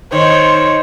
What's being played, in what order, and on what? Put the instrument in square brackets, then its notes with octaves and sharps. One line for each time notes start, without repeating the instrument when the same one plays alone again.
[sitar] D#3 [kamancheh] C5 [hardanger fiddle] C#5